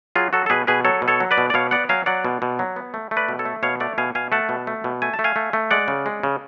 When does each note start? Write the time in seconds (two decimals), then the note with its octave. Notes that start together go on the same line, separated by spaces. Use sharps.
0.15 F#3 F4 G#4
0.33 F#3 F#4 A4
0.46 A4
0.50 B2 G#4 B4
0.67 B2 G#4 B4
0.85 F#3 A4 C#5
1.02 B2
1.08 A4 C#5
1.20 F#3
1.31 B4 D5
1.38 B2
1.50 D5
1.54 B2 C#5 F5
1.71 B3 D5 F#5
1.89 F#3 F5 G#5
2.06 F#3 D5 F#5
2.25 B2
2.42 B2
2.59 F#3
2.76 B3
2.94 A3
3.11 A3
3.17 B4 D5
3.29 B2
3.39 A4 C#5
3.45 A3
3.63 B2 C#5 F5
3.80 A3 D5 F#5
3.98 B2 F5 G#5
4.15 B2 F5 G#5
4.32 A3 F#5 A5
4.49 B2
4.67 A3
4.84 B2
5.02 A3 G#5
5.14 A5
5.19 A3
5.24 F5 G#5
5.36 A3
5.53 A3
5.71 G#3 D5 F#5
5.88 C#3
6.06 G#3
6.23 C#3